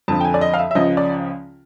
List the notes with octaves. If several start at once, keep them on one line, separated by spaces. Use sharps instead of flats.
F2 D3 F3 A5
G5
G#5
D5
D#5
F5
E5
E5
C#2 C#3 F3 D#5
D5